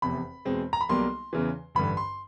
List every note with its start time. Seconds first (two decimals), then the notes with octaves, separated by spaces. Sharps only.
0.02 F1 E2 C3 B5
0.45 E2 B2 G#3 C4
0.73 A#5
0.81 B5
0.89 B1 B2 G3 A#3 C6
1.33 E2 C#3 E3
1.75 A1 G2 D3 B5
1.97 C6